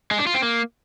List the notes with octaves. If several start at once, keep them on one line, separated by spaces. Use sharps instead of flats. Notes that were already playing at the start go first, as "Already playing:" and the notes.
G#3
D4
F4
C4
A#3